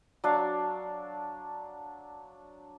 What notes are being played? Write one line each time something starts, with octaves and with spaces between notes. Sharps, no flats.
F#3 D4 F5